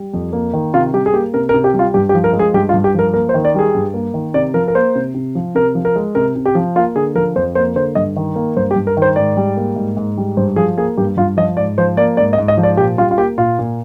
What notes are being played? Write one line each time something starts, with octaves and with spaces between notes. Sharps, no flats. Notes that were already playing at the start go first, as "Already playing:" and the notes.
Already playing: G3
F2
A#3
D#3
C3 F4
G3 G4
G#4
A#3 G4
C3 A#4
A#4
C3
G4
G3
F4
G2 G4
G4
F3
A#4
G#3
G#4
G2 G4
F4
G2
G4
F3 A#4
A#3 A#4
C5
D#3
D5
G3 G#4
G2
A#3
D#3
C3 D5
F3 A#4
A#4
A#3 C5
C3
C3
F3
C3 A#4
F3
A#4
G#3
C3 A#4
C3
G4
F3
A#3 F4
D3 G#4
F3 A#4
F2 C5
A#3 C5
D3 C5
G2 D#5
D#3
A#3
G2 C5
G4
G2
A#4
D#3
C5
G#2 D5
G3
A#3
G#2
G#2
G3
G2 C5
F3 G#4
A#3 G#4
G2 G4
G2 F4
F3 D#5
G#2 D5
F3 C5
A#3 D5
G#2 D5
D#5
G#2
D#5
F3
D5
A#2 G4
G3 F4
F4
A#3 G4
A#2 F4
A#2